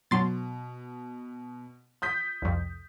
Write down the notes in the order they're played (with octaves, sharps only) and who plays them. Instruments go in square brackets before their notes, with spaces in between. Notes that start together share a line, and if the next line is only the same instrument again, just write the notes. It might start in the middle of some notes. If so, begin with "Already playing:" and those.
[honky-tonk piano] B2 [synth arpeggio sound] F#3 C6 A6
[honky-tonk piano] D#6 G6 B6
[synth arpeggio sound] C2 F2